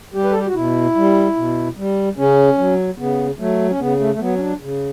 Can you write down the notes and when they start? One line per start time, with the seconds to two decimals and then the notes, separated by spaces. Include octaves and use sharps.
0.14 G3 G4
0.24 B4
0.31 A4
0.39 G4
0.47 F#4
0.55 B2 E4
0.96 G3
1.36 B2
1.77 G3
2.17 C#3 C#4
2.58 F#3
2.98 C#3 B3
3.39 F#3 A3
3.70 C#4
3.79 C#3 B3
4.00 A3
4.14 A3
4.20 F#3 B3
4.35 C#4
4.40 D4
4.60 C#3